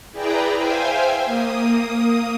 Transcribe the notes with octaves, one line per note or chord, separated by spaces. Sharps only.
E4 G#4 B4 D5 G5 A#5
C5 E5 F5 G5 G#5
A#3 D#6